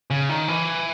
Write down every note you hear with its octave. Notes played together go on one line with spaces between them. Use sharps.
C#3
D#3
E3